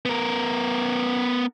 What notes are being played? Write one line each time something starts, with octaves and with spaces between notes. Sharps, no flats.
B3 A#4